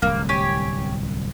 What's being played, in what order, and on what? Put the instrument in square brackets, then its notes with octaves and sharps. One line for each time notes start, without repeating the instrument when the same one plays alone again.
[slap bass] D1 C2 [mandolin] A#3
[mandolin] G4 C#5 G#5